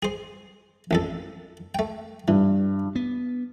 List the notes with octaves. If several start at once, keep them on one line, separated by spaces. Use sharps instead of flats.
G#4 C5
A1 F2 A4
A3 G5
G2 E3
B3